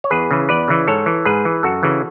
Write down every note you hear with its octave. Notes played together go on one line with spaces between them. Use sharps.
C#5
E2 G#4 B4
C#3 E3
E2 B4 D5
C#3 E3
G#2 A4 C#5
E3
G#2 G#4 B4
E3
F#2 F#4 A4
C#3 E3